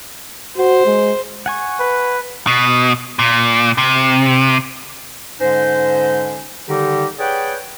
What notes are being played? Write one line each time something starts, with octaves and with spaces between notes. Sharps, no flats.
F#4 C5
G#3
F#5 G#5 C#6
B4
B2
A#2
C3
G#2 D3 G#3 C#4 D#4 C5
D3 D#3 G3 D#4 G4
G#4 B4 C#5 D5 F#5 G5